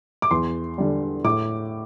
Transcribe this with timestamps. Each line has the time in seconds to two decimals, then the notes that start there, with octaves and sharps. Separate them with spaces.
0.22 D6
0.31 E2 C6
0.78 D3 G3
1.24 A2 D6